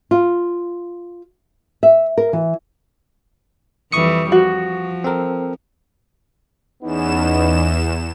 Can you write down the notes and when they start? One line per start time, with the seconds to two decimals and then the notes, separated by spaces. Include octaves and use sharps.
0.11 F4
1.83 E5
2.18 A#4
2.33 E3
3.92 F2 E3 G3 C#6 D#6 C#7
4.32 F3 F#4
5.04 C4 A4 A#4
6.83 E2 B3 C#4 D#4 E7